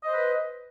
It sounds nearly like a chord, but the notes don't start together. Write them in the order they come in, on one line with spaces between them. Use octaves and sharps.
D#5 C5 B4